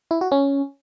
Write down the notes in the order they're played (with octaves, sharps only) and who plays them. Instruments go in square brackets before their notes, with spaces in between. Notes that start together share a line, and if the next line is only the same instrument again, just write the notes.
[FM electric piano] E4
F#4
C#4